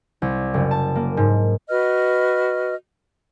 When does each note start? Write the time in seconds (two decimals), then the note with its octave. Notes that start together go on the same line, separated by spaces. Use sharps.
0.22 C2
0.54 F#1
0.71 A5
0.95 A#3
1.17 G#2
1.69 F#4 B4 D#5 F6